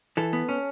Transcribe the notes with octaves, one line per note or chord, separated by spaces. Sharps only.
E3 A4
B3
C#4